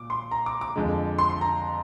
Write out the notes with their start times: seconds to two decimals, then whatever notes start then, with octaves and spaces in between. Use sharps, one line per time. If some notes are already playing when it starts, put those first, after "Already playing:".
Already playing: A#2 D6
0.10 C6
0.31 A#5
0.46 D6
0.61 D6
0.76 F2 D3 G#3
1.19 C6
1.30 C6
1.41 A#5